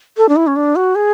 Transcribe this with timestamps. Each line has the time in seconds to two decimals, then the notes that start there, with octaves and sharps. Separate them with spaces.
0.17 A4
0.29 D4
0.36 E4
0.47 C#4
0.56 D4
0.76 F#4
0.95 G#4